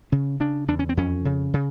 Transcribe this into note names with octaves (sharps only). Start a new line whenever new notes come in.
C#3 C#4
C#3 D4
E2 D4
C#4
C4
F2 C#4
C#3
C#3